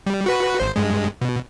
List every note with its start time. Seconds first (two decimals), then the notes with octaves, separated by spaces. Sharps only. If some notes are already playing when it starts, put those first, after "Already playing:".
0.07 G3
0.26 F#4 B4
0.60 G#1 C5
0.76 G2 G#3
1.21 B2